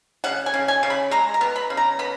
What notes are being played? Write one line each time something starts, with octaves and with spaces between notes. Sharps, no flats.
C#3 F#5
G#5
C#3
G#5
C#3
B5
G#3 A#5
A#5
B3
B5
C#3
A#5
B3 B5